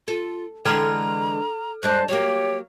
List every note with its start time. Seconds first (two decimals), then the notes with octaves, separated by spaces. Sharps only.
0.08 F4 A4
0.65 D3 E3 G#3 A4 A#5 F6
1.83 G2 G#3 C5 D5 A5 F#6 G6
2.08 F#3 A#3 G4 C#5